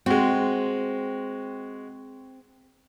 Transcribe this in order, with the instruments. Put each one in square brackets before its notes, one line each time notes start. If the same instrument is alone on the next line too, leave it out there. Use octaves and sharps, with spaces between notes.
[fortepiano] G#3 F#4 [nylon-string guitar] C4